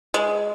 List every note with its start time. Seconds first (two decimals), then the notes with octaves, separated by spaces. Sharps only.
0.14 G#3